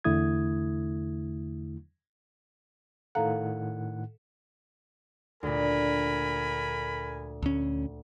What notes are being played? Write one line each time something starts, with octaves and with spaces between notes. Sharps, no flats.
E2 D3 A3 E4 D#6 G#6
A2 D#3 A4 F5 F#5 A#5
D2 A#2 A#4 G#5 B5
D2 C#4